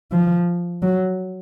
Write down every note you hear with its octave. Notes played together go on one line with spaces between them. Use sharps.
F3
F#3